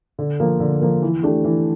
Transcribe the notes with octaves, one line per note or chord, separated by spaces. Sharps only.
D3
F3 A#3
D3
F3 A#3
E3
A3 D4 G4
E3